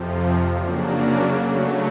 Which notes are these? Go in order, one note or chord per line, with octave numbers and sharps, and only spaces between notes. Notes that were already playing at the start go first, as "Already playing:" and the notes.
Already playing: F2 C3 F3
C#3 F#3 A#3 D4
C#3 F#3 A3